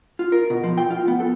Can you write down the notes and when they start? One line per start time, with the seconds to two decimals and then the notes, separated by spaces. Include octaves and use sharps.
0.19 F4
0.32 A#4
0.50 B2
0.64 F3
0.78 G5
0.91 F4
1.08 B3
1.20 A4